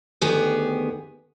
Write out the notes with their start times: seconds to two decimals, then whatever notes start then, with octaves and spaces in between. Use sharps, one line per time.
0.21 D2 D#3 B3 G4 G#4